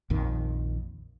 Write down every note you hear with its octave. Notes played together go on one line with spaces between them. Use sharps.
A#1 F2 D#3